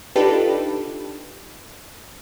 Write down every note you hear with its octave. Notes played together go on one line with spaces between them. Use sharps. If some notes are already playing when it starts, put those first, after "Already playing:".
D4 D#4 F4 G4 A4 B4